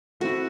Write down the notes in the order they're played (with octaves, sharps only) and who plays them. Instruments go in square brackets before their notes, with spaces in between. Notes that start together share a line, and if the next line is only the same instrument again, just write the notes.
[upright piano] A3 C4 E4 [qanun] F#4